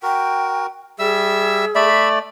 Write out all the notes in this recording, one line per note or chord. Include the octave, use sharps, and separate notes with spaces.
F#4 A#4 G5
G3 G#4 E5 E6
A3 D5 E5 B5